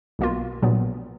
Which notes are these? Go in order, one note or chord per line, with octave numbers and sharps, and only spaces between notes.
B1 B2 A#3 F4
A#1 A#2 F#3 B3